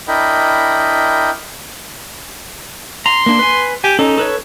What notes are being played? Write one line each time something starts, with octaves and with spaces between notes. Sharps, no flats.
D4 E4 A#4 D#5 G5 B5
A#5 C6
A#3 D4
B4 G#5
G4 G#5
C#4 D#4 A4
A4 B4 C#5